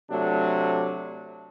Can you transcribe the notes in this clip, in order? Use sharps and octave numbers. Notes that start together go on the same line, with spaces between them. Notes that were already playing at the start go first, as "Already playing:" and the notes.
C3 F#3 A3 D4